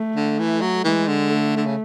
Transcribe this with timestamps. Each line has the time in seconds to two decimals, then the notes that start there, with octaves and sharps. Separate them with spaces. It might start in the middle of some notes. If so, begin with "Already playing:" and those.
Already playing: A3
0.16 D3
0.39 E3
0.61 F#3
0.84 E3 G#3
1.07 D3
1.30 A3
1.57 D3
1.66 C#3